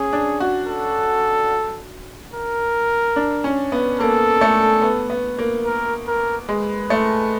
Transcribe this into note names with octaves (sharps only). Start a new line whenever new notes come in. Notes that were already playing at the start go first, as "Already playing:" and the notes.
Already playing: C#4 G#4
D4
F#4
A4
A#4
D4
C#4
B3
A#3 A4
A3
B3
B3
A#3
A#4
A#4
G#3 B4
A3